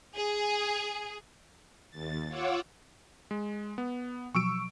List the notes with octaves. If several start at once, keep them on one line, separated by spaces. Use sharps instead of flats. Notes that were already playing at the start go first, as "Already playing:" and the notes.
G#4
D#2 A6
F4 C#5 F#5 D6 E6
G#3
B3
B2 F3 F#3 C#6 E6 D7